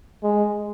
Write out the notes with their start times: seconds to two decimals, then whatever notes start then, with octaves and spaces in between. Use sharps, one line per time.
0.23 G#3